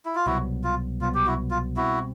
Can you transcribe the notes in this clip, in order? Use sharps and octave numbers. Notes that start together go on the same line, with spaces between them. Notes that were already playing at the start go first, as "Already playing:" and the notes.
E4
F4
C2 B2 F#3 B3 E4 F#4
F4
C2 B2 F#3 B3 F4
G4
E4 F#4
F4
B2 G3 C4 E4 F#4